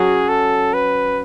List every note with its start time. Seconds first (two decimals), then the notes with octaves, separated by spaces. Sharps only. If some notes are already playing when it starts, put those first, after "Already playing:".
Already playing: F#3 C#4 F#4 G#4
0.28 A4
0.74 B4